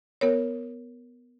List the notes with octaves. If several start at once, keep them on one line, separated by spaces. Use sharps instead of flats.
B3 A#4 C#5